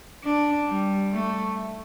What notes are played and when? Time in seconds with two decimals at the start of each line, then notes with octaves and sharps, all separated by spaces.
0.24 D4
0.68 G3
1.13 A3